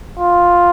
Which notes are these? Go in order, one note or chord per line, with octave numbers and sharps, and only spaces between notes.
F4